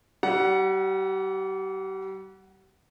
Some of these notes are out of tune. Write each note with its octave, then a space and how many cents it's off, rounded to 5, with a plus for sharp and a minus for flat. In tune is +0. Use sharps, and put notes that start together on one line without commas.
G3 -35 F#5 +0